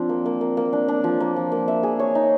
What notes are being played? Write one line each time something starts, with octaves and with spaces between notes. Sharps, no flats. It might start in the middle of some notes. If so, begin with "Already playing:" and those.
Already playing: F3 C4 D4
A#3
A#3
A#3
A#3
D4
D4
F3
A#3
F3
A#3
E5
G#4
C#5
D#4